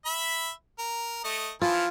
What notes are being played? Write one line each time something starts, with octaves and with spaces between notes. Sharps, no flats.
E5 B5
A#4
A3 D#5
E3 F3 F4